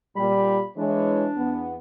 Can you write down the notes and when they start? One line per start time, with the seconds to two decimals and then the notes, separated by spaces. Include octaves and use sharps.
0.16 A#2 G3 B5
0.78 E3 G#3 D4 C#5
1.37 E2 B3